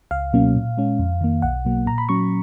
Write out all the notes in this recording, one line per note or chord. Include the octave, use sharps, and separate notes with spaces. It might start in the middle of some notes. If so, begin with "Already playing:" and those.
C#2 F5
B2 F#3 A#3 C#4
A#2
G#3 C#4
F2
D#3 A#3
B1 F#5
B2 F#3 A#3
A#2 A#5
B5
F#3 C#4 C#6